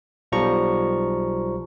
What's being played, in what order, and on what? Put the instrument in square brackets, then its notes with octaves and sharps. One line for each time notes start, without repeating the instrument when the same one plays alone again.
[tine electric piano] B1 F3 G3 A#5 C#6